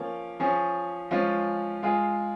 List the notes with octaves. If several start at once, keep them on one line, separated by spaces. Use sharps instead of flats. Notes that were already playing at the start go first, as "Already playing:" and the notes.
Already playing: F3 A#3 C#4
F3 C#4 G#4
F3 G#3 C#4 F4
G#3 F4 G#4